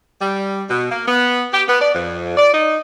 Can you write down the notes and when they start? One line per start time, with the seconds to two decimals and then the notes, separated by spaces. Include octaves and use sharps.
0.21 G3
0.70 B2
0.91 A#3
1.08 B3
1.54 G4
1.68 B3
1.81 D5
1.95 F2
2.37 D5
2.54 D#4